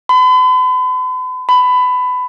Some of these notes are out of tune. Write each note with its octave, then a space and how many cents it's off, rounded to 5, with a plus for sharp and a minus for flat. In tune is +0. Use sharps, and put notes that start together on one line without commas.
B5 +45
B5 +20